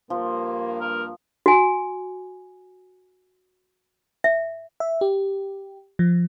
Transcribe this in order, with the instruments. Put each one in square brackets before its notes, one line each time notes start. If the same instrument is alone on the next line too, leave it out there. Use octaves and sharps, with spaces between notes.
[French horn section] G2 A#3 [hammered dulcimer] F3
[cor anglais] A#4
[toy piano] F#4 G#5
E5
[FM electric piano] E5
G4
F3